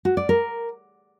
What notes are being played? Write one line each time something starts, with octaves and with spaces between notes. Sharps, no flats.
F#4
D5
A#4